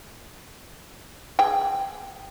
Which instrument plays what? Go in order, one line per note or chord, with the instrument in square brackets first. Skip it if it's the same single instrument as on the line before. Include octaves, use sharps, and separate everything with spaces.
[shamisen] G#4 G5